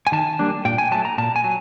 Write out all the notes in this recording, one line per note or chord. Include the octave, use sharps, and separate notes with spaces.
G#5
D#3 A5
G3 A#3 D4
A#2 G5
G#5
F#3 A3 A5
A#5
A#2 A5
G#5
F#3